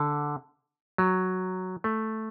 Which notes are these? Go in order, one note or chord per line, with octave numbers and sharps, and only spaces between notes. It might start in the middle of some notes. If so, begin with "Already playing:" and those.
Already playing: D3
F#3
A3